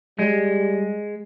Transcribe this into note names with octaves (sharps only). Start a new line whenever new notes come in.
G3 G#3